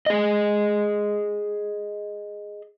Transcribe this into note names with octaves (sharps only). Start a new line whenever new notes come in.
G#4 D#5